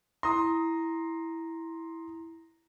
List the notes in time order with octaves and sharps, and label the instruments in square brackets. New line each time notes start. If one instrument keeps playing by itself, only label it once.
[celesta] E4 A#5 A#6 [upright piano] C6 D#6